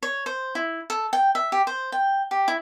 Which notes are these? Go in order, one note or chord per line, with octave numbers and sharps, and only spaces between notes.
C#5
C5
E4
A4
G5
E5
G4
C5
G5
G4
E4